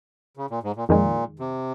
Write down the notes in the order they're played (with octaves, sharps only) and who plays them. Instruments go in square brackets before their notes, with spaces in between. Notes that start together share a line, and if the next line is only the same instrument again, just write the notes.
[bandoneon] C#3
A#2
G#2
A#2
[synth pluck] F2 D#3 G#3 [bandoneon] A#2
[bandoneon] C3